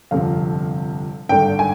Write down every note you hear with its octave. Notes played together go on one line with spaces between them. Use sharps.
G1 F2 C3 F3 F5
G#1 G2 D3 G5
G#5